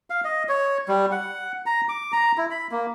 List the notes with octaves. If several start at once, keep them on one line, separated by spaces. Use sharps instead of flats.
F5
D#5
C#5
G3
F#5
A#5
D6
A#5
E4
B5
A#3